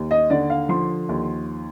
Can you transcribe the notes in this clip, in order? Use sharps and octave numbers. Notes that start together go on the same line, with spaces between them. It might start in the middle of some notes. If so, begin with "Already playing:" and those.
Already playing: D#2
D#5
D3 D5
F5
F3 C6
D#2